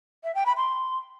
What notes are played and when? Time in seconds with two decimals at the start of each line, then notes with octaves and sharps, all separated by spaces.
0.24 E5
0.35 G5
0.46 B5
0.57 C6